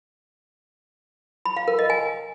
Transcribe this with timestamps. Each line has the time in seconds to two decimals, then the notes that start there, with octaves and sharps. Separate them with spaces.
1.45 B5
1.57 F5
1.68 A#4
1.79 D#5
1.90 G#5